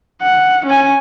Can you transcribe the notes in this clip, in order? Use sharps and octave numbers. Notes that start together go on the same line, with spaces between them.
F#5
C#4 G#5